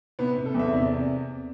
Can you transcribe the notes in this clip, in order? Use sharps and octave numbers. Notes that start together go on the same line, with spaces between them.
C3 B3
C3
A4
E2 E5
C3 D5